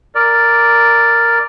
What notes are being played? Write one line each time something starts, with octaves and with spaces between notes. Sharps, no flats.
A#4 D5